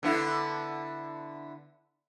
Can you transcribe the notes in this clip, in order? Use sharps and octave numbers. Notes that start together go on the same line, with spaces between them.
D3 B3 E4